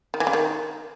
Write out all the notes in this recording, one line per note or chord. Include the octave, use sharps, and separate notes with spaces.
D#3
E3
C#3
D#3